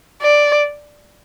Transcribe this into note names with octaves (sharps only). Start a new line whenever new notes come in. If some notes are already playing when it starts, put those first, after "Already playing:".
D5